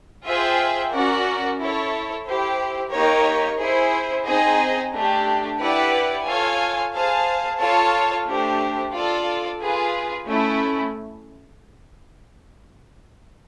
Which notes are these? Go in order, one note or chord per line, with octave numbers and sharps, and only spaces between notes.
F4 G#4 C5 E5 G5
C#4 F#4 A#4 D5 F#5
E4 A4 C#5
E4 G4 C5
A#3 D#4 G4 A#4 C#5
E4 G#4 C5
C4 D#4 G#4 C5 D#5
A3 D4 G4
E4 G4 B4 D5 F#5
F4 A4 C#5 F5 G#5
G#4 C5 F5 A5
F4 A4 C#5 F5 A5
A3 D4 G4 C5
F4 A4 D5
F4 G#4 B4
A3 C#4 E4